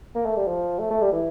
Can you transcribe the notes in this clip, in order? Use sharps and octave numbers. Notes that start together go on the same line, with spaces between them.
A#3
A3
G3
F3
A3
A3
G3
E3